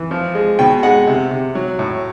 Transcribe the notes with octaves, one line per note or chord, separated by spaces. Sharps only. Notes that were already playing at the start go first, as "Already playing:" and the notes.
Already playing: E3
F3
G#3
B2 G5
G#3 F#5
C3
C3
F#3
A2